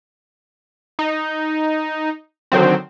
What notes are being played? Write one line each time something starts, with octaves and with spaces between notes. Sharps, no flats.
D#4
D3 D#3 F#3 C4